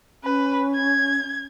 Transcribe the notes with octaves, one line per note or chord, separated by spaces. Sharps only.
C#4 B4
G#6